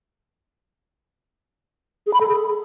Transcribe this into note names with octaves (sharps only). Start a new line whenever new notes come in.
G#4
B5
A4
G#4